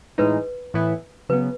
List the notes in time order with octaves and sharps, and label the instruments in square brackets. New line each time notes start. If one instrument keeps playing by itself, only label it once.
[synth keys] A2 E3 G#3 D#4 [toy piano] B4
[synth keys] A2 E3 B3 E4
[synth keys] C#3 F#3 B3 [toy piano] B4